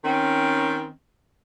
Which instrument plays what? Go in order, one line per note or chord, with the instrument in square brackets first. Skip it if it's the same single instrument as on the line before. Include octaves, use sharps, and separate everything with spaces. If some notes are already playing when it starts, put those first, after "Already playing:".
[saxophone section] D#3 C4 C#4